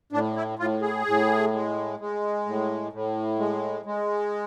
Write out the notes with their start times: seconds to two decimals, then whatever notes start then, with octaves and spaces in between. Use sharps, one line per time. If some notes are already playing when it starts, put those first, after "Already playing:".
0.12 A2 D4
0.36 E4
0.59 A2 F4
0.82 G#4
1.06 A2
1.53 G#3
1.99 G#3
2.46 A2
2.93 A2
3.39 G#3
3.85 G#3